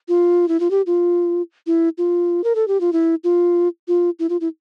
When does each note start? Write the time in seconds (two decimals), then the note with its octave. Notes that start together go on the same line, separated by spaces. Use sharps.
0.08 F4
0.48 E4
0.60 F4
0.71 G4
0.86 F4
1.67 E4
1.98 F4
2.44 A#4
2.55 A4
2.68 G4
2.80 F4
2.93 E4
3.24 F4
3.88 F4
4.19 E4
4.29 F4
4.41 E4